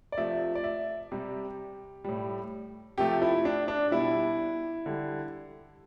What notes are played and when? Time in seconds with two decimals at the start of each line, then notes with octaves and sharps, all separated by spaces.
0.12 D5
0.17 C3 F3 A3 E5
0.55 D5
0.64 E5
1.12 C3 G3 G4
2.04 A2 G3
2.98 C3 F3 A3 G4
3.22 E4
3.45 D4
3.68 D4
3.91 B2 G3 E4
4.86 D3 G3